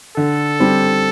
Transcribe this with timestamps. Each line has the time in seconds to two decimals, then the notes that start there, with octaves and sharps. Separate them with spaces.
0.17 D3 A4
0.60 G3 C4